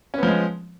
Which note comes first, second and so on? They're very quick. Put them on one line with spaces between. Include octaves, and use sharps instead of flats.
C#4 B3 F3 G#3